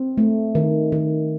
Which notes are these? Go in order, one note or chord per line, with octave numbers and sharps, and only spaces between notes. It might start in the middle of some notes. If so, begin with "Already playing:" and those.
Already playing: C4
A3
D#3
D#3